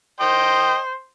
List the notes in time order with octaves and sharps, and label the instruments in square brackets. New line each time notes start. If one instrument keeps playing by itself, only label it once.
[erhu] C5 [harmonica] D#5 G5